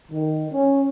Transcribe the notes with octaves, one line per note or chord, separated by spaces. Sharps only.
D#3
C#4